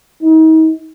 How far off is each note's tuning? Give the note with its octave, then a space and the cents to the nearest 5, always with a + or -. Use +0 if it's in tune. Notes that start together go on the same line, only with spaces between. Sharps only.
D#4 +40